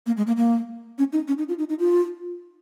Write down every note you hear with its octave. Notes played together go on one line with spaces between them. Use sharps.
A#3
G#3
A#3
A#3
C#4
D#4
C#4
D#4
F4
D#4
D#4
F4